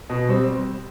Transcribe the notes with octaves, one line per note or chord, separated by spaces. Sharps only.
B2
G3 C4